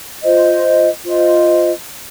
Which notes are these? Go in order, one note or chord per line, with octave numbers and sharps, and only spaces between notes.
F4 C5 D#5
F4 C5 D#5